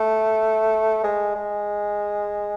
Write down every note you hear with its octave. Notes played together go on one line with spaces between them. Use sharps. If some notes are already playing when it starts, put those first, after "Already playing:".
Already playing: A3
G#3
G#3